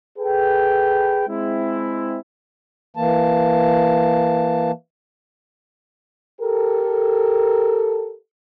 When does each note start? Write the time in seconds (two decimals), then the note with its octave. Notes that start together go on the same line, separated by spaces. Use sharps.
0.18 G#4 A4 B4 G5
1.28 G#3 C4 E4
2.96 E3 A#3 A5
6.41 G4 A4 A#4